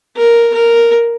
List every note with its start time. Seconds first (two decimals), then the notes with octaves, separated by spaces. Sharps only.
0.16 A#4
0.54 A#4